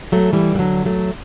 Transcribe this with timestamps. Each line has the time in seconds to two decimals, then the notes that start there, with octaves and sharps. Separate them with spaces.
0.12 F#3 A3
0.33 E3 G3
0.55 E3
0.59 D3 F#3
0.85 F#3 A3